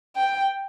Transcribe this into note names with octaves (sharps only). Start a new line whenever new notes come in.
G5